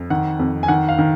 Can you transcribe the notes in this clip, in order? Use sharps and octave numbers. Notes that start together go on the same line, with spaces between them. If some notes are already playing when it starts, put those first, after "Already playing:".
Already playing: F2
D#3 F#5
F2
G#5
D#3 F#5
F5
D#3